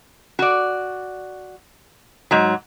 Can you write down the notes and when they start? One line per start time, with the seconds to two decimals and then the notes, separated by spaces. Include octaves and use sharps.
0.39 F#4 D5
2.31 G#2 F#3